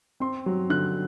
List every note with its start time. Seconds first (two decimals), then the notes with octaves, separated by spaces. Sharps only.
0.20 C4 C6
0.46 F#3
0.70 D3 F#6